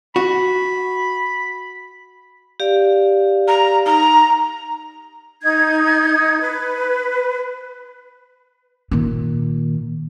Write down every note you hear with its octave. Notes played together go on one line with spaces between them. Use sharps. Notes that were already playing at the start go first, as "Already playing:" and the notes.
F#4 B5
G4 D5 F5
A#5
D#4 A#5
D#4 G#6
B4
A#2 D#3